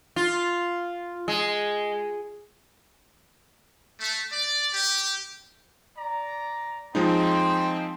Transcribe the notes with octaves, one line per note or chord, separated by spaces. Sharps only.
F4
G#3
A3
D5
G4
D5 A#5
F3 G#3 C4 D#4